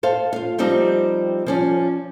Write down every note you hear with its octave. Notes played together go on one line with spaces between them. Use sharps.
A4 C5 F5
F4 F5
F3 G3 C4 D#4 G4
F3 C#4 D5